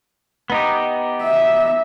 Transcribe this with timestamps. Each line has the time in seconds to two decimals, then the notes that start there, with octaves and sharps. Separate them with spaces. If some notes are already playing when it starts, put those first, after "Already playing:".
0.50 B3 D#4 G4
1.23 E5